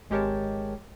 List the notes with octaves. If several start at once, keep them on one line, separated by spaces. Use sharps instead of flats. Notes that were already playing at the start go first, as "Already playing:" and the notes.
G#1 G#3 G4 A#4 C#5 A5